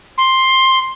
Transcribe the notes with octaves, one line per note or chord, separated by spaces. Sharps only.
C6